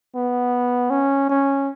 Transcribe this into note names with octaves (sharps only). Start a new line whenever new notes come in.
B3
C#4
C#4